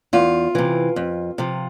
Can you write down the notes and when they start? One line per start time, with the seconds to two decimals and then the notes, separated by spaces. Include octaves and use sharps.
0.13 E2 F4
0.55 C3 E3
0.96 F2
1.38 C3 F3